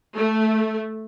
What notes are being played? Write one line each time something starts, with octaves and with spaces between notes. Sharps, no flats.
A3